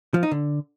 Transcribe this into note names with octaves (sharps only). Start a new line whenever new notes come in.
F3
D#4
D3